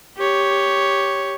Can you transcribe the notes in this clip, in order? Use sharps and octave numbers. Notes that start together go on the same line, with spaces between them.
G4 C#5